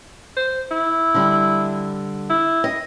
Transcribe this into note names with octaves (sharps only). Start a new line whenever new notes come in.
C5
E4
D3 G3
E4
D#5